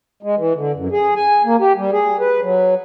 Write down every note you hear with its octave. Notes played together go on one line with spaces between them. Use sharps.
G#3
E3
D3
F#2
G#4
G#5
A#3
G4
G3
G#4
B4
F#3